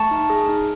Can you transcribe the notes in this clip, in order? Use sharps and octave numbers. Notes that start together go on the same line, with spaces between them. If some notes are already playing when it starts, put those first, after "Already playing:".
Already playing: A3 A5 C#6
D#4
G#4
D#4